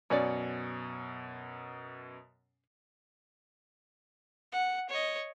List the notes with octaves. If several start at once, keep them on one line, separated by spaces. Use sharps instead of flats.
F#2 B2 C#4 C#5 D5
F#5
C#5 D#5